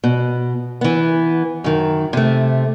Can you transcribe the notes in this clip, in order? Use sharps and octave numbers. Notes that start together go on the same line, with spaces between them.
B2
E3 B3
F#2 D#3
C3 A3